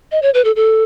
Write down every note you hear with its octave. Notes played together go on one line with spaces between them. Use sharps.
D#5
C#5
B4
A4
A4